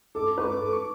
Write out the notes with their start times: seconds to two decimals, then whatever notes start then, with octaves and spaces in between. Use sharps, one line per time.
0.15 A4 D6
0.38 B4 C#6
0.46 D6
0.61 A4
0.72 C#6
0.77 D6